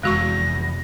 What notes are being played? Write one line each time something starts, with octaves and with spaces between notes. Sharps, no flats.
F1 E2 G#3 F#4 C#6 A#6